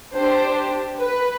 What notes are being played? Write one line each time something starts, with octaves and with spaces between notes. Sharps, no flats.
D4 G4 C5
B4